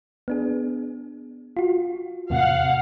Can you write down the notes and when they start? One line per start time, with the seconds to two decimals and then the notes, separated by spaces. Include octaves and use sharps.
0.28 B3 D4 G#4
1.57 F4 F#4
2.30 E2 A2 C3 F5 F#5